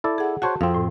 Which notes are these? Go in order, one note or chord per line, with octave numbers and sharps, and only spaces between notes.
E4 A4 D5
G#4 F#5
F#4 C5 C#5 F#5 A5
F2 C4 F5
A2